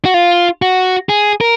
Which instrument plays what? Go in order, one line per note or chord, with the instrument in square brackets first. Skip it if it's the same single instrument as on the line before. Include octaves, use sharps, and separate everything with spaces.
[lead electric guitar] F#4
F4
F#4
G#4
A#4